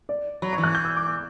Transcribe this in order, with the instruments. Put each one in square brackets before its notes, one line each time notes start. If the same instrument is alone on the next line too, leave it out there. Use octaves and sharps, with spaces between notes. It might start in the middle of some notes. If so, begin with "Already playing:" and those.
[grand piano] D5
[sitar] F#3 [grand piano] B5
[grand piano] C#6
[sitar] E3
[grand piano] F#6
G6
E6
D6
D6